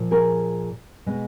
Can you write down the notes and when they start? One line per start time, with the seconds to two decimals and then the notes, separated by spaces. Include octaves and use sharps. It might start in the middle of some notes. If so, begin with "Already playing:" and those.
Already playing: A#2 F3
0.11 G#4 A#4
1.06 B2 G#3 B3